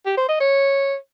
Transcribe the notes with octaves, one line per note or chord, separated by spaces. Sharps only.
G4
C5
D#5
C#5